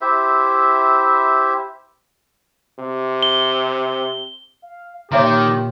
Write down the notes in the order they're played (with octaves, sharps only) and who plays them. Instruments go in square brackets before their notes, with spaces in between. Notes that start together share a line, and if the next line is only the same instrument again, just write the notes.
[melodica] E4 G4 C5 E5
[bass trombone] C3
[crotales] G7
[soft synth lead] F5
[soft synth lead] A#2 [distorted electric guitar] D#3 [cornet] G4 [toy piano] C#5 E5 C6